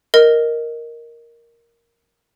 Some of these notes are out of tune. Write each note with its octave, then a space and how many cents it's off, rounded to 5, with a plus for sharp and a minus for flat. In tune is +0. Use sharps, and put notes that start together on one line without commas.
A#4 +0 D#5 +0